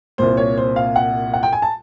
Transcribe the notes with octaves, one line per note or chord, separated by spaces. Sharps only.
C2 A#2 C5
C#5
C5
F5
F#5
F#5
G5
G#5
A5